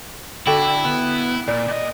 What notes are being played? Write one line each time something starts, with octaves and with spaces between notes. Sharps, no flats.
D3 E4 F#4 A4 G5
B3
A#2 D5
A#2 D#5